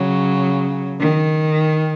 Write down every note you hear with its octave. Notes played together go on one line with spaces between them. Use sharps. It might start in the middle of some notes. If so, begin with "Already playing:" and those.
Already playing: C#3 F#3
D#3